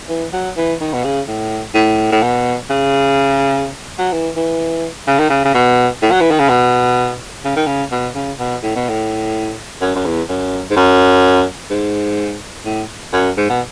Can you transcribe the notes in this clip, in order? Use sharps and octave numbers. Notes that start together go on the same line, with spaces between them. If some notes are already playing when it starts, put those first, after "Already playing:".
E3
F#3
E3
D#3
B2
C#3
A2
A2
A2
B2
C#3
F#3
E3
E3
C#3
D#3
C#3
C#3
B2
A2
F#3
E3
D#3
C#3
B2
C#3
D#3
C#3
B2
C#3
B2
A2
B2
A2
F#2
F#2
E2
F#2
G#2
F#2
G#2
A2
F#2
G#2
B2